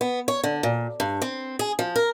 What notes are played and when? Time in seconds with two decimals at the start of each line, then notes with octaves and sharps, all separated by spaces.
0.01 B3
0.28 C#5
0.44 D3
0.63 A#2
1.00 G2
1.22 C4
1.59 G#4
1.79 F3
1.96 A#4